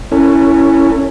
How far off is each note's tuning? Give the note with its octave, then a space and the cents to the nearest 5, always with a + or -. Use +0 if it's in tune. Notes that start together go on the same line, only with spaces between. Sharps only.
C#4 +0 E4 +0 A4 +40